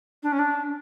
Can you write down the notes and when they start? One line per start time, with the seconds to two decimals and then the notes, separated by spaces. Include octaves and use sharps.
0.23 D4
0.32 C#4
0.39 D4